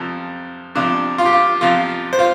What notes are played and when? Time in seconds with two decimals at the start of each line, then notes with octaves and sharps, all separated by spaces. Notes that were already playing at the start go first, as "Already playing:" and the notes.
Already playing: F2 C3 F3
0.75 F2 C3 F3 D4
1.18 F4
1.25 G4
1.33 F4
1.61 F2 C3 F3 F4
2.13 C5
2.19 F4